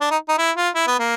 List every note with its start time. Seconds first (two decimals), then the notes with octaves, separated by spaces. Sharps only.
0.01 D4
0.10 D#4
0.28 D#4
0.38 E4
0.56 F4
0.75 E4
0.87 B3
0.99 A#3